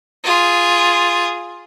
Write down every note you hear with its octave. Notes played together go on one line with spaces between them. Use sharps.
F4 G#4